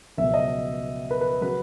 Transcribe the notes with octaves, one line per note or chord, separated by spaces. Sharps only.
C#2 B2 F#3 E5
D#5
B4
B4
C#3 F#3 B4